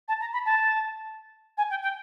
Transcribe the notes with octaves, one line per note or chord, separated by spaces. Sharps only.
A5
A#5
B5
A5
G#5
G5
G5